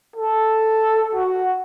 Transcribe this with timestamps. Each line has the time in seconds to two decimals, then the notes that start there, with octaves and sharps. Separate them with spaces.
0.16 A4
1.15 F#4